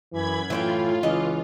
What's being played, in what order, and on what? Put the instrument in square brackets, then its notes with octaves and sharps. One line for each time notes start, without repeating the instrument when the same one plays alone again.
[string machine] F#2 B5 G#6 [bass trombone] E3
[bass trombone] A2 [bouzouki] E3 C5 G5 [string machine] F4
[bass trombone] C#2 [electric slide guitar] E3 [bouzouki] D#5